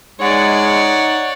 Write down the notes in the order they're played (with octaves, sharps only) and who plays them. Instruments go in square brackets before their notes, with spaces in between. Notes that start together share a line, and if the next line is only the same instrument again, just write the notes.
[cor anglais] G#3 [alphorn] D#4 [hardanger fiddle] C#5 D5 [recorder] F#5